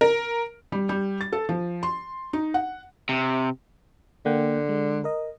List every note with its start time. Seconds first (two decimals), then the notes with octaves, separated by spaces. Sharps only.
0.01 A#4
0.72 G3
0.89 G3
1.21 A6
1.32 A4
1.49 F3
1.83 C6
2.33 D#4
2.54 F#5
3.09 C3
4.26 D3 A#3 F#5 G5
4.69 G#3
5.04 A#4 D#5